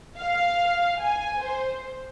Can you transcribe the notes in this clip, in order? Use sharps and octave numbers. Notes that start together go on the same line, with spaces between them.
F5
G#5
C5